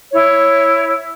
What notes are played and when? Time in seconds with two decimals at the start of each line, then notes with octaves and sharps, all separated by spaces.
0.12 E4 C#5